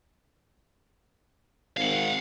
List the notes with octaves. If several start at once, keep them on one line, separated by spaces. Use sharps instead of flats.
G#1 F5 F#5